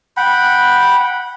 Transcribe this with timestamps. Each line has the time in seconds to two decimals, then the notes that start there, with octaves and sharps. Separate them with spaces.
0.17 F#5 G5 B5